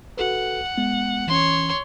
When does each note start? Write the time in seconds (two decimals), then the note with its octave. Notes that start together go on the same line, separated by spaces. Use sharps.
0.17 F#4 A4 B4 F#5
0.78 G#3 B3
1.28 E3 C#4 C#5 C6